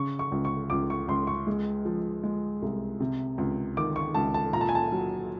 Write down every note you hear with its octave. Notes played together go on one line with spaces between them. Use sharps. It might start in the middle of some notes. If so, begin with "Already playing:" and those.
Already playing: C#3 C#6
C#6
C#2
C#6
C#2 D6
C#6
C#2 C6
C#6
G#3
F3
G#3
C2
C3
C#2
D#3 D6
C#6
C#2 A5
A5
A#2 A#5
A5
G#5
A5
F#3